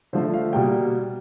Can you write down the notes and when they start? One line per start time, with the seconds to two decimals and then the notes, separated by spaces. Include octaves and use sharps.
0.13 D3 F3 A3 C5
0.34 F5
0.53 B2 G3 A#3 G5